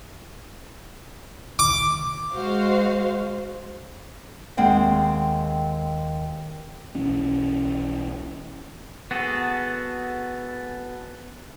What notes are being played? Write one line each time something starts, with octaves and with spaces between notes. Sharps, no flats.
D6
G#3 F#4 C5 F5
D#2 G#3 C4 F#5 G5
B1 E3 C#4
B3 F#4 G#4 A4